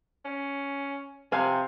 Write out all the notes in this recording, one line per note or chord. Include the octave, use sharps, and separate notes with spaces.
C#4
C3 F3 F5 G#5